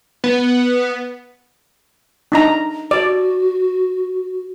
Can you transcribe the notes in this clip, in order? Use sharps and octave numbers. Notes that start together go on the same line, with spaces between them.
B3
D4 D#4 A#5
F#4 D5